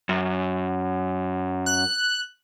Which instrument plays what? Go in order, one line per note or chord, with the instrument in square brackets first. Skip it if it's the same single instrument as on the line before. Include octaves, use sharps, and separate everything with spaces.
[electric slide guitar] F#2
[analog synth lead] F#6